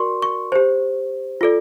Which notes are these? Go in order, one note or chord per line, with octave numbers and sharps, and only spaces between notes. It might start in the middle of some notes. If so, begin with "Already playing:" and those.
Already playing: F#4 A#4 D5 C6 C#6
C#6
G4 C5
F4 A4 D5